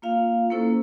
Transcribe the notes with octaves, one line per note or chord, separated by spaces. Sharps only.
A#3 F4 F5
A#3 C#4 E4 A4 C5